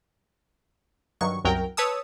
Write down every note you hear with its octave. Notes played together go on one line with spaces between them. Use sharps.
G2 D#3 F#3 C#6
C2 F#2 F#3 A#4 G5
B4 C#5 A5 D#6 E6